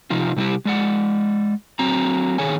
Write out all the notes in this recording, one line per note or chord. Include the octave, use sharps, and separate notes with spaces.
C3 F3 D#4 F4
C3 G3 D#4 E4 G4
G#3 D5 F#5
F#3 C4 A#5
D#3 G#4 C#5 G#5